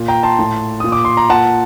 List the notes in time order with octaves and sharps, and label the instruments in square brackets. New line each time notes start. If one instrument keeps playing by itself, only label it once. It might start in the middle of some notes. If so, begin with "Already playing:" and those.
Already playing: [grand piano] A#2
G5 A#5
A5 C6
A2
A#2 D#6
D6
C6
A#5
A#2 F#5 A5